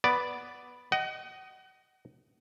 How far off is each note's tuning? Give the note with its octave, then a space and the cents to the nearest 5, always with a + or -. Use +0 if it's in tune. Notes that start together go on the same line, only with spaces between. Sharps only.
B3 +0 D5 +0
D#5 +0 F#5 +35